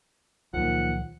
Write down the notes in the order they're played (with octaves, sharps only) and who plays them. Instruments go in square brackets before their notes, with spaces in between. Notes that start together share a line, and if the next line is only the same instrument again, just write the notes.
[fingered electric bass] C#2 F#3 [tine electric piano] A#2 D#3 F3 [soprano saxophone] F#5